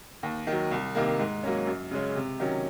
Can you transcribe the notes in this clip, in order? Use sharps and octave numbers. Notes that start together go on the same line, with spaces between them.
D#2
D#3 F#3
C2
C3 D#3 A#3
G#2
F#3 A#3 C#4
F#2
C#3 G#3 C#4
C3
D#3 F#3 C#4